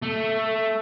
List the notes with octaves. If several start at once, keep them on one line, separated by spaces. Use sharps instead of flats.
A3